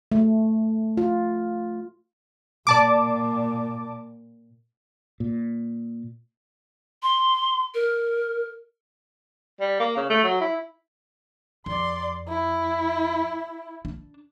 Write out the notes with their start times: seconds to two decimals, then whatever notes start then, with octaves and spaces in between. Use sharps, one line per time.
0.12 A3
0.97 F4
2.67 A#2 D5 A5 D6
5.20 A#2
7.03 C6
7.74 A#4
9.61 G3
9.79 A#3
9.96 C#3
10.10 A3
10.24 F#3
10.40 E4
11.66 F2 D5 C6
12.28 E4
13.85 D4